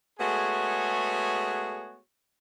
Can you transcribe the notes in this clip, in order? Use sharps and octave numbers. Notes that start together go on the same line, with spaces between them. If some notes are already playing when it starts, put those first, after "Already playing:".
G#3 A3 B3 F#4 G#4 C#5